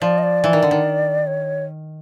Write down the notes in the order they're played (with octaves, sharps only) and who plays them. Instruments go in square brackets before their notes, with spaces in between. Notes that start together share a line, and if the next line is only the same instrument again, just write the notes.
[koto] F3 [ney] D5
[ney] D#5
D5
[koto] E3
D#3
D3
D#3
[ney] C#5